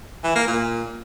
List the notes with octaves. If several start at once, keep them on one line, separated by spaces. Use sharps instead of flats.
E3
A#3
A#2